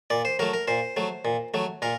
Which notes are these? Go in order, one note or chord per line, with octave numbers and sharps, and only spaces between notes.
A#2 D5
C5
F#3 A3 A#4
A#4
A#2 C5
F#3 A3
A#2
F#3 A3
A#2 A#4